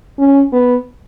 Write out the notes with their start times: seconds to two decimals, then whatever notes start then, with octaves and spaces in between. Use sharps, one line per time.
0.18 C#4
0.52 B3